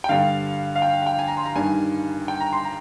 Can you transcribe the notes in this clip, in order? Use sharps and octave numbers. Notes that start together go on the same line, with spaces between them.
G5
G2 D3 F5
F5
G5
F5
G5
G#5
A#5
C6
A#5
G2 D#3 G#5
G5
A#5
C6
A#5